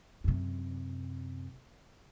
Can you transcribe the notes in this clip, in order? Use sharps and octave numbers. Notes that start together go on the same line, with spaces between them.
F#2 C3